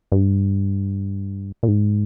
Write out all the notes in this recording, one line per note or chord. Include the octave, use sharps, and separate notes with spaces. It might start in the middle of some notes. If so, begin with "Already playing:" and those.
G2
A#2
G#2